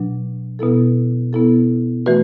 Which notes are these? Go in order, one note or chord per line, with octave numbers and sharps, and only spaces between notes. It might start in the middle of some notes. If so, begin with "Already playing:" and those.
Already playing: B2 F#3 D4
B2 B3 E4 A4
B2 B3 E4 A4
E3 A3 F#4 B4